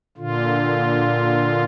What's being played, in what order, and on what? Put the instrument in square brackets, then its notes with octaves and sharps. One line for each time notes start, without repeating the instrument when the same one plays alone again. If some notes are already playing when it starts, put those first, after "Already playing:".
[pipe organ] A#2 D3 F4